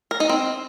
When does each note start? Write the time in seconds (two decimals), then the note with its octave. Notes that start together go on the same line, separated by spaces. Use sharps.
0.11 A#4
0.20 D#4
0.29 C4